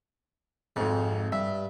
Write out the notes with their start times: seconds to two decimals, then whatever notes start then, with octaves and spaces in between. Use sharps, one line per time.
0.76 G#1 F2 G#2
1.32 G2 E5